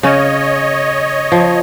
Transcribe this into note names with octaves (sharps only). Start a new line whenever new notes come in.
C#3 C#4 C#5 D#5
F3